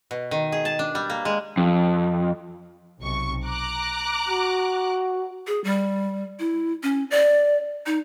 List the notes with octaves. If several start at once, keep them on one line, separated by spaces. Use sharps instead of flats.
B2
D#3
G#4
A5
D4
G3
A#3
G#3
F2
B1 C3 C#6
A#5 D6 F#6
F#4
G#4
G3
E4
C#4
D5
D#4